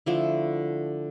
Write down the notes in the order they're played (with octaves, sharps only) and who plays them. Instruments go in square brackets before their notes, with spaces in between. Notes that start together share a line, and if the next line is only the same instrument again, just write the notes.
[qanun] D3 F3 A3 E4